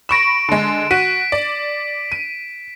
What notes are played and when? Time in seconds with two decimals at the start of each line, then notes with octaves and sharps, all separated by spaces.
0.09 B5 C#6 A#6 D7 E7
0.49 D3 G#3
0.91 F#4 B6 D#7
1.32 D5
2.12 D#7